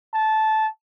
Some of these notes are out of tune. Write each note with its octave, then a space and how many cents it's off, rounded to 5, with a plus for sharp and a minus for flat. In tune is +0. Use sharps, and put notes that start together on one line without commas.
A5 -15